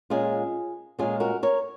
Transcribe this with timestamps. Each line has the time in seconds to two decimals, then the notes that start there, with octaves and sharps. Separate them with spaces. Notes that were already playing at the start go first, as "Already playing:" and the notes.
0.10 A#2 G#3 C#4 F4 G#4
0.99 A#2 G#3 C#4 F4 G#4
1.20 F#4 A#4
1.43 A#4 C#5